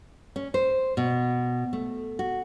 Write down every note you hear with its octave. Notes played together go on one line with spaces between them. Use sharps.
C#4
C5
B2
A3
F#4